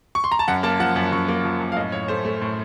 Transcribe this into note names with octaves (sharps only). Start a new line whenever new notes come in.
C#6
C6
A#5
A5
F#2 F#5
A#3 A5
F3 F#5
F#2
F#2 C#6
A#3
F3
F#2
F5
A2 D#5
A2 C#5
A3 C5
A3
A2